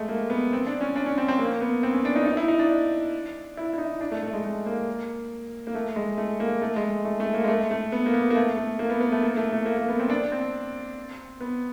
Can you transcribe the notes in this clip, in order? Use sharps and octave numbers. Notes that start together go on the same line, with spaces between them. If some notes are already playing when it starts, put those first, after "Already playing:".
Already playing: G#3 A3
A#3
B3
C4
D4
C#4
D4
C#4
C4
C4
A#3
B3
C4
C#4
D4
D#4
D#4
E4
D#4
D4
E4
E4
D#4
D4
A3
A3
G#3
A3
A#3
A#3
A3
G#3
A3
A#3
A3
G#3
A3
A3
A#3
G#3
A3
A3
B3
A#3
B3
A#3
A3
A3
A#3
B3
B3
A3
A#3
A3
A3
A#3
A#3
B3
C4
D4
C4
B3